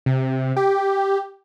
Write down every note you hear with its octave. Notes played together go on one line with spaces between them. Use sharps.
C3
G4